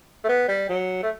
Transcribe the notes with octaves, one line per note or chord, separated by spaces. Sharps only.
A3
B3
G3
F#3
A3